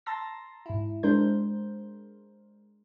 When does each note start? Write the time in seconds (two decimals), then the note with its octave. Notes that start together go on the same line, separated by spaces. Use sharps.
0.06 A5 A#5 C6 E6 A6 A#6
0.66 G#2 E4
1.03 G#3 D4 A#4 C5 G6